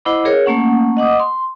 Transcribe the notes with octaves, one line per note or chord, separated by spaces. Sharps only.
E4 C5 D#5 F#5 B5 D6
G#4 A#4 C#5
A3 A#3 C#4 F#5
D#5 F#5 D6 D#6
C6